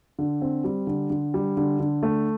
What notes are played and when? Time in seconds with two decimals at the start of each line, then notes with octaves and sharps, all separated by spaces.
0.19 D3
0.42 C4
0.64 G3
0.87 D3
1.10 D3
1.34 G3
1.57 D3
1.80 D3
2.03 A3